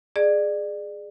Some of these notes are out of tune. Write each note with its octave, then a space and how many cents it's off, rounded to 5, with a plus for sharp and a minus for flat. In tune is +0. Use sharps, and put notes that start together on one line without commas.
G#4 +0 D5 +25